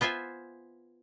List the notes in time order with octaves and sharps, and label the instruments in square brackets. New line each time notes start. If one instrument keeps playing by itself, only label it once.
[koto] B3 F4 C5 E5 G#5